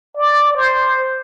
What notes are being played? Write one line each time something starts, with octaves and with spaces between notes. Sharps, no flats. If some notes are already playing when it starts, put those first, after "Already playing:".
D5
C5